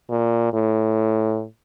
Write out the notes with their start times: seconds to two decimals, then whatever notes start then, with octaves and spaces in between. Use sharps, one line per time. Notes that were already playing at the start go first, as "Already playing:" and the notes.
0.10 A#2
0.53 A2